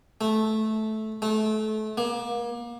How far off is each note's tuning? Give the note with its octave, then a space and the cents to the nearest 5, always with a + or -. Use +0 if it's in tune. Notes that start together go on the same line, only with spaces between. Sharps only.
A3 -15
A3 -30
A#3 +30